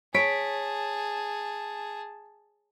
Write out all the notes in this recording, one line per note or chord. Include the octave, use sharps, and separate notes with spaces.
G#4 C#5 A5 B6 D7